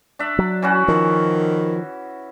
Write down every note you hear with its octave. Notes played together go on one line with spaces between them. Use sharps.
D4 E5
F#3
E3 C#4 F#4
D#3 F3